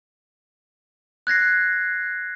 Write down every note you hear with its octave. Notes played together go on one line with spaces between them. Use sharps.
F#6 G#6 A#6 C7